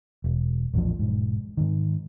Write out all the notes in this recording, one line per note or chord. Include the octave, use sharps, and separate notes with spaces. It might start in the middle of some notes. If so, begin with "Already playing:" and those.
E1
A#1 E2 A2 F3
E1 G#2
G#2 D#3